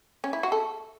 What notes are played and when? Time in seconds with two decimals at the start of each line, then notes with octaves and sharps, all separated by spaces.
0.24 C#4
0.33 E4
0.43 F#4
0.52 A4